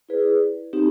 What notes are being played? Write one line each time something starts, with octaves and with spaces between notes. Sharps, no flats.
E4 G#4 B4 D5
C4 D#4 G4